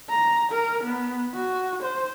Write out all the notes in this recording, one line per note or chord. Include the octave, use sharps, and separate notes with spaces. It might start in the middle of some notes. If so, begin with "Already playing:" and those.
A#5
A#4
B3
F#4
C5